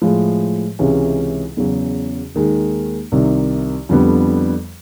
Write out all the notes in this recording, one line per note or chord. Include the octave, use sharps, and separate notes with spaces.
A2 F3 G#3
C#2 C3 E3 G#3 C#4
E2 C#3 F#3
D#2 D#3 G#3
C2 C3 D#3
F2 D3 G3 B3